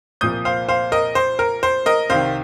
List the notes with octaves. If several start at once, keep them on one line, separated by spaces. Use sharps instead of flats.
C2 A#2 F3 A#3 D#6 G6
C5 F5
C5 F5
A#4 D#5
C5
A#4
C5
A#4 D#5
C2 C3 D#3 C5 F5